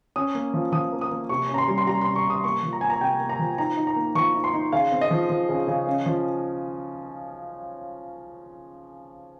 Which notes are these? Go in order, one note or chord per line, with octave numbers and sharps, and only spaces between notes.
C#4 D#6
A#3
F3
F3 D#6
A#3
D#6
A#3
C3 C#6
C#4 A#5
C6
G3
C6
G3 A#5
C3 C6
C#6
C3 D#6
A#3 C#6
F3
A#5
A#3 G#5
A#5
C3 G5
A#3
A#5
F3
D#4 A#5
D#4
A#5
A#3
F3 C#6
D#4
C6
D#4
C#3 F5
C4
D#5
F3
F3
C#3
C#3
C#4
F3